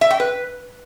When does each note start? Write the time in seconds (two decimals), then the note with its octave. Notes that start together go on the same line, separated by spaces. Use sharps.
0.01 E5
0.11 G5
0.20 B4